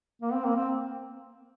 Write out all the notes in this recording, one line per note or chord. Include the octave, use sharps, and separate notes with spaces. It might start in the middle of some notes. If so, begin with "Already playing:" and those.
A#3
C4
A#3
C4